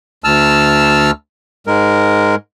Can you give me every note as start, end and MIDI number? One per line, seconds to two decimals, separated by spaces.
0.24 1.11 38
0.24 1.11 81
0.24 1.11 88
0.24 1.11 89
1.67 2.35 44
1.67 2.35 56
1.67 2.35 70